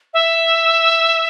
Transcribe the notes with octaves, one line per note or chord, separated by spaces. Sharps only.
E5